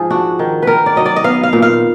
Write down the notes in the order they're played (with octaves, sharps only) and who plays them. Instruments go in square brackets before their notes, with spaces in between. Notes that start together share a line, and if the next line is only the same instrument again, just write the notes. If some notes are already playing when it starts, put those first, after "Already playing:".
Already playing: [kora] G#2 F3 G#4
D4 F#4
D#3
D#3 A#4 B4
D5
F#3 D#5
D5
D#5
B3 F5
F5
A#2
F5